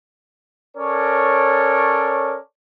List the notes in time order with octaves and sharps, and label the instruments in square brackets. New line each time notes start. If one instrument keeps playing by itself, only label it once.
[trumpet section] C#4 A4 A#4 C#5 D5